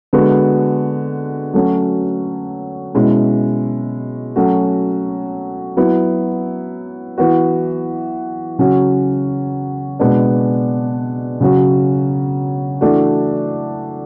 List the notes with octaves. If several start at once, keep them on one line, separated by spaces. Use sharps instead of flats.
D3 G#3 B3 F#4
F#3 A3 C#4 F#4
B2 G#3 C#4 E4
F#3 A3 C#4 F#4
F#3 B3 E4
E3 B3 F#4
C#3 F#3 C#4 F#4
B2 G#3 B3 D4
C#3 F#3 C#4 F#4
E3 A3 D4 F#4